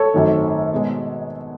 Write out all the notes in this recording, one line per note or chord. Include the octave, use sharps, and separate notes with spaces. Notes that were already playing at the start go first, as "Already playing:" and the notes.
Already playing: A4 C#5
G#1 F#2 D#3 A3
B2 G#3